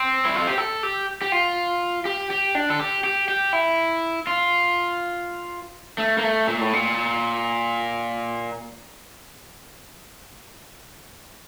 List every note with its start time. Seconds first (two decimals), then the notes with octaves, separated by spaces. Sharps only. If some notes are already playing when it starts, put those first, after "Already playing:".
Already playing: C4
0.25 E4
0.36 F4
0.47 G4
0.58 A4
0.83 G4
1.22 G4
1.32 F4
2.05 G4
2.30 G4
2.55 D4
2.70 A4
2.80 G4
3.04 G4
3.28 G4
3.53 E4
4.27 F4
5.98 A3
6.18 A#3
6.23 A3
6.47 A#2
6.61 A2
6.73 A#2